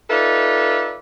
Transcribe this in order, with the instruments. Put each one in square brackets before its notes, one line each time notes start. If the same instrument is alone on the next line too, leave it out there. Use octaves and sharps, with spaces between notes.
[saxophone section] D#4 F4 A4 B4 D5 E5